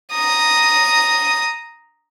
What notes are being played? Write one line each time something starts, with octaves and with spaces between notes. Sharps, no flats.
A#5 D#6